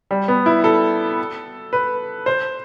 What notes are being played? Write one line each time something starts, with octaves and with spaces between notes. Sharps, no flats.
G3
B3
E4
A4
B4
C5